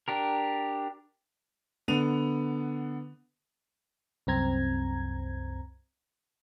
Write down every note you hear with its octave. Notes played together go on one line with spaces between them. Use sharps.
D4 G4 A#4
D3 B3 D#7 F7
C2 F#2 C4 A#5 G#6